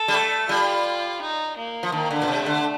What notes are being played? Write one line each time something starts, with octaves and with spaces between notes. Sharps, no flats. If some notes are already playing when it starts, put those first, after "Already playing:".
Already playing: A4
G3
A3
G3 F4
D#4
A#3
F3
D#3 A#3
D3
A#2
C3 A3
D3